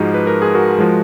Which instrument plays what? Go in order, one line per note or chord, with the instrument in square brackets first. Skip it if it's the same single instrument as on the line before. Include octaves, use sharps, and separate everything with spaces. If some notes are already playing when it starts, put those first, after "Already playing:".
Already playing: [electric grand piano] G#2 F3 G#3 D#4 F#4
B4
A#4
G#4
F#4 A#4
F3 G#3